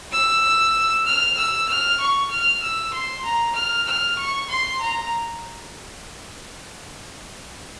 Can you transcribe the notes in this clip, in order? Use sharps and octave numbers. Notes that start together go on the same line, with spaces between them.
E6
F6
E6
F6
C#6
F6
E6
C6
A#5
F6
F6
C#6
C6
A#5